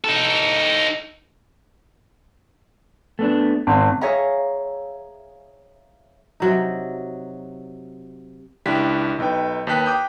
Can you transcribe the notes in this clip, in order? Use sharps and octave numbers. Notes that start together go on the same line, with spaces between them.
D#4 A4
A3 B3 D4
G#1 C4
G#4 C#5 E5 F5 A#5
C3 F#3 D#4
C#2 D4 E4 G4 B6
B1 D#4 B4 G5
D#2 B4 G5 F#6 B6
G5 D6 D#6 F#6 G6